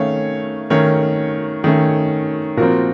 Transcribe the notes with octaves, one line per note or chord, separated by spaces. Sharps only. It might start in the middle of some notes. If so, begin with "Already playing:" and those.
Already playing: D#3 A3 C#4 C#5 F5
D#3 A3 C#4 A#4 C#5
D#3 A3 C#4
A#2 F3 C4 F#4 A#4